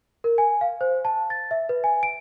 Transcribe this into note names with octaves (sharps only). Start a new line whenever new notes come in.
A#4
G#5
F5
C5
A5
A6
E5
B4
G#5
D7